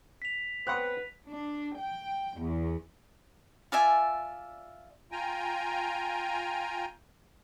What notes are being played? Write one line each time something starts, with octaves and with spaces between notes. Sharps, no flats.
B6 F7
B3 C4 B4 C#5 F#5 F#6
D4
G5
E2
F4 D5 E5 G#5
F4 G5 G#5 A#5